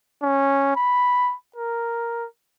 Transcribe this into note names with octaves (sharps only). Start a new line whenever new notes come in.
C#4
B5
A#4